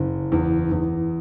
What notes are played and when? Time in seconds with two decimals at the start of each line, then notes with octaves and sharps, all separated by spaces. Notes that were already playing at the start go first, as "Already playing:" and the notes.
Already playing: F#1
0.32 E2
0.72 E2